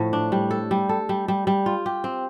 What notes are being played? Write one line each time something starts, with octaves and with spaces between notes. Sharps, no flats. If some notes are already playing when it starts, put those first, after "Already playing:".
Already playing: A2 F3 A3
D4
G3
A4
G3
A4
G3
G3
G3
F4
G4
C4